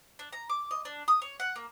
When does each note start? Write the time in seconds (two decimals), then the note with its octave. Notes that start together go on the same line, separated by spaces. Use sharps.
0.19 D4
0.33 A#5
0.49 D6
0.71 D#5
0.85 D4
1.08 D#6
1.22 C#5
1.40 F#5
1.56 A#3